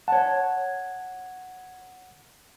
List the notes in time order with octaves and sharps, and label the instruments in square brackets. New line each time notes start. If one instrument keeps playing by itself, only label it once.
[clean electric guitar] C#5 A5 [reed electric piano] F#5